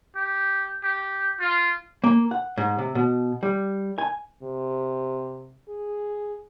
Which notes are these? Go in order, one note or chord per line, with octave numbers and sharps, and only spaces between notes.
G4
G4
F4
A#3
F#5
G#2
C3
B2
G3
G#5
C3
G#4